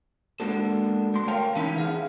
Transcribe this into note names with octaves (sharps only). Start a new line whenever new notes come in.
G#3 A#3 B3 D4 F#4 A4
A3 C6
A#4 C#5 F5 G5 A5
E3 C#4 D#4 E4
B3 G#4 E5 F5